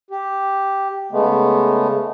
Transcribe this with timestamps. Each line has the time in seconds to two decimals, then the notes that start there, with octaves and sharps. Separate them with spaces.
0.11 G4
1.12 C#3 G#3 A3 B3